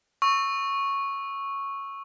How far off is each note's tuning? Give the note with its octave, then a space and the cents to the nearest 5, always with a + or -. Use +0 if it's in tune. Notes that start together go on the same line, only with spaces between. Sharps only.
C#6 -5 E6 -5